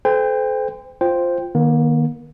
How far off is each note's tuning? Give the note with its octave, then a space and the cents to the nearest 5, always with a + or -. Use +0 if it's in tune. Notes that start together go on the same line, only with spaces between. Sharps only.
A4 -35 C5 -35 G5 +30
F4 +0 C5 +0 G5 +0
D#3 -20 A#3 +40